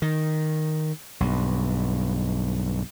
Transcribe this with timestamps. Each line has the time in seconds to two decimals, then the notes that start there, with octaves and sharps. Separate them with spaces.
0.02 D#3
1.20 B1 G2